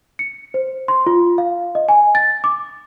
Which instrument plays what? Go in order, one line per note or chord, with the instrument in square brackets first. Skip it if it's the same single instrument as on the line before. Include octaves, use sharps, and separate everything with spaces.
[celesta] C#7
C5
C6
F4
F5
D#5
G#5
A6
D6